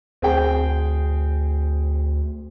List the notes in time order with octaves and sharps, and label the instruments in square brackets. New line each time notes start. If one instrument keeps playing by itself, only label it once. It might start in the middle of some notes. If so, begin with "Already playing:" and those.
[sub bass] D2 [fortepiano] C4 G#4 G5